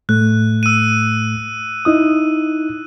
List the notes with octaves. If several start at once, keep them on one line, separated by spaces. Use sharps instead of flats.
A2 A3 F#6
E6 D#7
D#4 E4 D#6